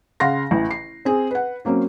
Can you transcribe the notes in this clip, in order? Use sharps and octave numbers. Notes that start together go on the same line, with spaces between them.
C#3 F5 F#5 C6 A#6
A1 E3
C7
C4 G#4
B4 F#5
F#3 A#3 C4 C#4